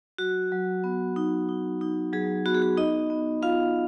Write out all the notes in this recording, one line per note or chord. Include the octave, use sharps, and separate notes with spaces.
F#3 F#4
F#3
B3
D#4
D#4
D#4
F#3 G#4
B3 F#4
G#4
F#4
B3 D#4 D#5
B3
B3 F4 F5